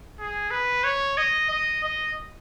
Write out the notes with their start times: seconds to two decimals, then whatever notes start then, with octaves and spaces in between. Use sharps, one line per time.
0.19 G#4
0.51 B4
0.84 C#5
1.17 D#5
1.50 D#5
1.84 D#5